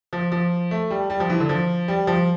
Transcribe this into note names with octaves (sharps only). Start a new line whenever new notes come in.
F3
F3
A3
G3
G3
F3
E3
D3
F3
G3
F3